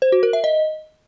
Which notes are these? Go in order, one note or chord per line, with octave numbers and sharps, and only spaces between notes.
C5
F#4
A#4
E5
D#5